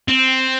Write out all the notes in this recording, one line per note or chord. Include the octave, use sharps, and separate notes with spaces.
C4